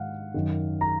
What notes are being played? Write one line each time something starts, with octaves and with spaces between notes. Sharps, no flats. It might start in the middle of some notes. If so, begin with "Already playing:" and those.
Already playing: G#2 D#3 F5 F#5
F#2 D#3
A#5